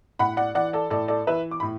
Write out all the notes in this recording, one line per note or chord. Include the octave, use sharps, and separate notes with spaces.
A2 F#5 B5
D5 F#5
E3 D5 F#5
A4 D5
A2 A4 D5
A4 D5
E3 B4 E5
D6
A2 B5